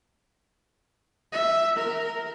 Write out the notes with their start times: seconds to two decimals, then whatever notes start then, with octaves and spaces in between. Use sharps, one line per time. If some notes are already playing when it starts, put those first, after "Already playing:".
1.32 E5
1.78 A#4